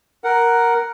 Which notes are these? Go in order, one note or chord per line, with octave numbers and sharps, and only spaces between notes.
A#4 F#5